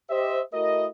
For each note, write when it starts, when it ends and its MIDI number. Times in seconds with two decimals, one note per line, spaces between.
0.10 0.41 67
0.10 0.41 72
0.10 0.41 75
0.10 0.41 76
0.54 0.86 57
0.54 0.86 64
0.54 0.86 66
0.54 0.86 70
0.54 0.86 75